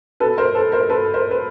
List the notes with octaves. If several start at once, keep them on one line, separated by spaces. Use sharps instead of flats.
B2 A4 B4
A#4 C5
A4 B4
A#4 C5
A4 B4
A#4 C5
B4